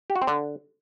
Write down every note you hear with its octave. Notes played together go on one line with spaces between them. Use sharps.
G4
F#4
C4
D3